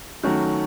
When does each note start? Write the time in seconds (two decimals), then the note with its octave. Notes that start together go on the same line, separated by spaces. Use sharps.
0.24 D#3 F#3 A3 C#4 F#4